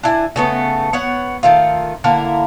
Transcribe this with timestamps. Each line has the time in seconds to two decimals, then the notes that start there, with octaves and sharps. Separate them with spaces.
0.03 D4 E4 G#5
0.36 C#3 A3 B3
0.93 B3 C#5 F#5
1.43 D#3 A3 F4
2.04 D3 A#3 E4 A#4